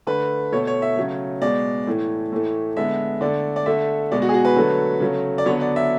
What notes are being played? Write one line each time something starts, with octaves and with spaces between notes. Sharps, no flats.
D3 A3 B4
B2 A3 C#5
C#5
E5
C#3 F#3 A3
B2 G#3 B3 D5
A2 E3 A3
A2 E3 A3
D3 G#3 B3 E5
D3 A3 D5
D5
D3 A3 E5
B2 G#3 B3 D5
F#4
G#4
F#4
B4
D3 F#3 A3
C#3 F#3 A3
D5
D3 F#3 B3 C#5
D5
E5